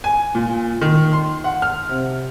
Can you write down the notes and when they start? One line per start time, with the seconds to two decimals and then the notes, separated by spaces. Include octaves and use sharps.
0.04 G#5
0.35 A#2
0.81 D#3
1.13 C6
1.44 F#5
1.62 F6
1.89 C3